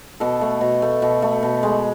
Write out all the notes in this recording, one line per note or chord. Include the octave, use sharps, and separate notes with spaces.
B2 A4
A3
B2
A3
B2
A3
B2
G#3